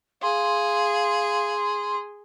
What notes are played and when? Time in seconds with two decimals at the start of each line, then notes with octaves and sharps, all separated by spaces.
0.22 G#4 F5 C6